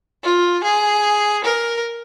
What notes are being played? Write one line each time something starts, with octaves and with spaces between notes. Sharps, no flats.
F4
G#4
A#4